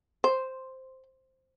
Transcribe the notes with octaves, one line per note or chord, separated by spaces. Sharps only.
C5